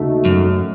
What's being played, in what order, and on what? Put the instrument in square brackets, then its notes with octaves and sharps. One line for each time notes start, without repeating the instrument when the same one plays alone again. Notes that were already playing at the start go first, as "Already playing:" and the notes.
Already playing: [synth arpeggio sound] D#2 C#3 A3 D#4 F#4
[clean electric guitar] F#2